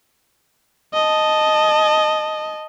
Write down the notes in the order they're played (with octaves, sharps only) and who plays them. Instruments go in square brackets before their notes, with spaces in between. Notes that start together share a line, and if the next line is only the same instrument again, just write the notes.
[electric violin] D#5 A5